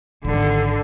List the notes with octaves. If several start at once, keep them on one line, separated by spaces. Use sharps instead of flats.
G#1 D3 D#3